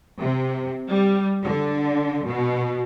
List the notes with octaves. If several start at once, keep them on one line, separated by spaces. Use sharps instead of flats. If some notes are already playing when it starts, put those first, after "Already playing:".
C3
G3
D3
B2